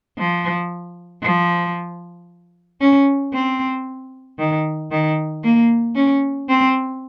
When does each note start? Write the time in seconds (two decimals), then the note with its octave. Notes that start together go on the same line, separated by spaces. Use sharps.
0.18 F3
1.23 F3
2.81 C#4
3.33 C4
4.39 D#3
4.91 D#3
5.44 A#3
5.95 C#4
6.49 C4